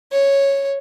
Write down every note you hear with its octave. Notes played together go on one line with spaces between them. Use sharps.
C#5